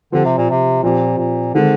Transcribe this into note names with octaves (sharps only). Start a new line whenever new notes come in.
D3 F3 C4 G4
C3
A#2
C3
A#2 F3 C4 G4
A#2
D3 D#3 G#3 C4